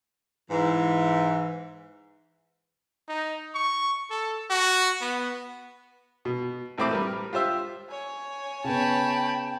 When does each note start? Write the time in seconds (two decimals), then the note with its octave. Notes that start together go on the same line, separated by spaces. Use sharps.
0.51 G#2 E3
3.08 D#4
3.54 C#6
4.10 A4
4.50 F#4
5.01 B3
6.25 B2
6.78 A1 A3 C4 B5 D6
6.91 G3 A#4 B4
7.33 F4 G4 C5 E5
7.90 C#5 G#5
8.64 C#3 B3 G5 A5 B5